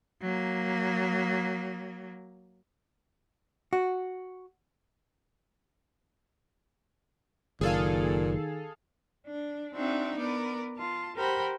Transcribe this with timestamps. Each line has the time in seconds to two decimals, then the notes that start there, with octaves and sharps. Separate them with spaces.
0.21 F#3 A#3
3.73 F#4
7.61 F#1 A#2 D#3 G#4 A4 F5
9.27 D4
9.73 C4 D4 D#4 F#4 E5
10.17 B3 A#4 D5
10.78 F4 A5
11.16 G4 A#4 C5 F#5 B5